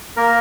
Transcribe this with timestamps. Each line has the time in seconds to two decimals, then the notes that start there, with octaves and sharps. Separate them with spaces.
0.17 A#3 A#4